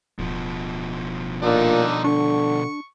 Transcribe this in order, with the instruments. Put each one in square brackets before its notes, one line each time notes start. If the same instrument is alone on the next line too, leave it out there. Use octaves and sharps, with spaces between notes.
[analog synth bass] D1 [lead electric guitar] B2 F3
[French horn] A#2 [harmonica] D3 D4 D#4
[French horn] D3 [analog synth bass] D4 [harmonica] C#6